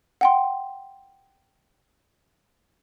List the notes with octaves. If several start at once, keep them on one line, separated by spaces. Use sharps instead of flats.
F#5 G5 C6